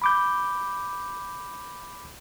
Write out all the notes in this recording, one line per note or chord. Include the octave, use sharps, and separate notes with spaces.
B5 D6 G6